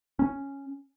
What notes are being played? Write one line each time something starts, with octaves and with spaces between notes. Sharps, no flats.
C#4